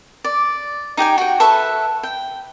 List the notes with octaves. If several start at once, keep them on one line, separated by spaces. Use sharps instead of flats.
D5
D#4 G4 G5 G#5
F#4 G5
A4 B4 E5 C#6
G5